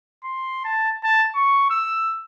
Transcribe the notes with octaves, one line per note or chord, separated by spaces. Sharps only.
C6
A5
A5
C#6
E6